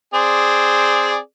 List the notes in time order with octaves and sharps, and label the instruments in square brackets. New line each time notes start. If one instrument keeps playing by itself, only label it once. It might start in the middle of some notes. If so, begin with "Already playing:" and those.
[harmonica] C4 G#4 D5